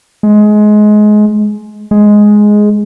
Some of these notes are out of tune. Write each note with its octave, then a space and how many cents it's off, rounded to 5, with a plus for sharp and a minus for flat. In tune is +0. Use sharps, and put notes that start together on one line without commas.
G#3 +20
G#3 +5